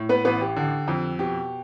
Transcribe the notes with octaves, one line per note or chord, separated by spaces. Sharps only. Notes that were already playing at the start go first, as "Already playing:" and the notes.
Already playing: A2
B3 B4
A1 B3 B4
G4
D3
F2
B2 G4